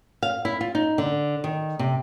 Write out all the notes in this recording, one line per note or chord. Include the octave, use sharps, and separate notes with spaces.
F5
E4
F4
D#4
D3
D#3
C3